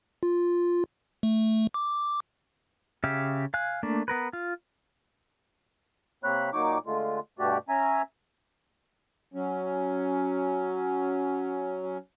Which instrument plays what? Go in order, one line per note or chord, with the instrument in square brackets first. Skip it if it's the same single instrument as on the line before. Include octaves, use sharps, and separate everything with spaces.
[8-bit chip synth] F4
A3
D6
[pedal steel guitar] C#3 G4 E5 F5
F5 G#5 F#6
A3 A#3 D4
B3 A#4 B4
F4
[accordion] C3 A#3 C4 C#5 B5 F#6
A#2 F#3 D#4 C#5 D6
D3 G#3 A3 F4
G2 B2 A3 F#4 G4 D5
C#4 E5 G#5 A#5
[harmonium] F#3 C#4